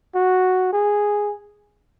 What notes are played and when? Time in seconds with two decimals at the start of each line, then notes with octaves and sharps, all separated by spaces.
0.15 F#4
0.72 G#4